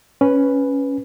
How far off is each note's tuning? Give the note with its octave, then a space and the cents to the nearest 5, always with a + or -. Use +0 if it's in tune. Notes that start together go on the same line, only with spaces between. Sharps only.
C#4 +0 B4 +0